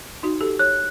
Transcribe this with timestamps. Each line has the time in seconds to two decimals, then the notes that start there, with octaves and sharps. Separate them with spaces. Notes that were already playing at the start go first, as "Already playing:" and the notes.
0.23 D#4 F#4
0.41 G4 A4
0.59 C#5 F#6